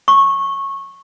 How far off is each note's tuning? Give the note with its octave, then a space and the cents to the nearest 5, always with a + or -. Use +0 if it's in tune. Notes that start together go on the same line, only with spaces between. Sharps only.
C#6 -15